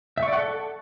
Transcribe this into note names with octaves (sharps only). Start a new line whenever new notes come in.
E5
C#6
D5
F#5
A4